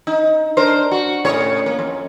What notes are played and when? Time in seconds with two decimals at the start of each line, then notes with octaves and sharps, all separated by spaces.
0.07 D#4
0.57 D4 A#4 C5
0.91 F#4
1.25 A2 C#3 C#5
1.66 A#3
1.79 F2